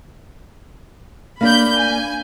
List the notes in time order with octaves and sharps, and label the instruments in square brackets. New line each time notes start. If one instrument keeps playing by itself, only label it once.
[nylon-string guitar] A#3 D4 D5 [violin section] B5 G6
[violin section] G#5